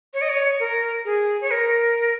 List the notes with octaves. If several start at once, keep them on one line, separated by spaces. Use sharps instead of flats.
C#5
D#5
C#5
A#4
G#4
C#5
A#4